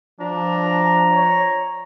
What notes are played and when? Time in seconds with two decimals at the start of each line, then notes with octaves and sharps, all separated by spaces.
0.20 F3 D4 A#5
1.12 C#5